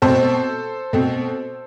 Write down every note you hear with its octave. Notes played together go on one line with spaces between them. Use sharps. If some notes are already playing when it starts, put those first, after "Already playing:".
B2 A3 C4 A4 C5
B2 A3 C4